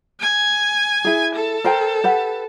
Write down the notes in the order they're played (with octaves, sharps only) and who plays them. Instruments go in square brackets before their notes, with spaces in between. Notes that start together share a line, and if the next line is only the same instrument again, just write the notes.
[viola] G#5
[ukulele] E4 G#4
[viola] A4
[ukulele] A#4 C5 G5
G4 B4 F#5